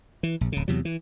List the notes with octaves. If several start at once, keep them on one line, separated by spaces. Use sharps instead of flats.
E3
A#1
D1 C#3
E2 C3 F#3
E3